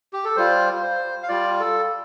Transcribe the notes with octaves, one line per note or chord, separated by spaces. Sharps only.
G4
A4
G3 F4 C5
C5
F5
G3 F4 D5
A4